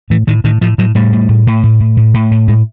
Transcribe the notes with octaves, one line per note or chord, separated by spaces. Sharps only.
A2 E3
A2 D#3
A2 D#3
A2 F3
A2 F#3
A2 G3
A2
A2
A2
A2
A2
A2
A2
A2
A2 G#3